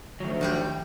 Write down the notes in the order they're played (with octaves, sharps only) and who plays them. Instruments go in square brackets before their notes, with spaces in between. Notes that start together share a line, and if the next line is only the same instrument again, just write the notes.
[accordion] D2 [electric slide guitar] D#3 F3 F#3
[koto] A2 G3 G4